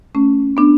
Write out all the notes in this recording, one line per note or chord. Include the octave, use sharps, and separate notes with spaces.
A3 C#4
B3 D4